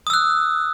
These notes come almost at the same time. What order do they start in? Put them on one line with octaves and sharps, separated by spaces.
D#6 E6 F#6